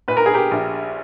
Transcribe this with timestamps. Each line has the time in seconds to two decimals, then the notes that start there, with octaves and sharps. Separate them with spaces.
0.08 A#2 B4
0.17 A#4
0.26 G#4
0.34 G4 A#4
0.51 A#1